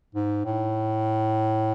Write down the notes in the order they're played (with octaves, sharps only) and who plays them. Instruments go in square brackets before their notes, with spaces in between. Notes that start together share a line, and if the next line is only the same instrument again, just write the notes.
[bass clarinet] G#2
A2